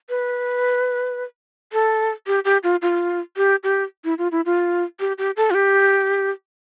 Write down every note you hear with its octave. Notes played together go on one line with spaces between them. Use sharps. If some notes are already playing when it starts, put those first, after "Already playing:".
B4
A4
G4
G4
F4
F4
G4
G4
E4
F4
E4
F4
G4
G4
A4
F4
G4